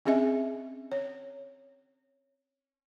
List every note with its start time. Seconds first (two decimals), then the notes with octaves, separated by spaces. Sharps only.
0.06 C4 C#4 G#4 D#5 E5 G#5
0.92 C#5